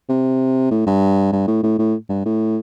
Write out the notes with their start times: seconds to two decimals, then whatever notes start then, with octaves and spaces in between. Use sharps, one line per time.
0.09 C3
0.71 A2
0.87 G2
1.33 G2
1.48 A2
1.63 A2
1.79 A2
2.09 G2
2.26 A2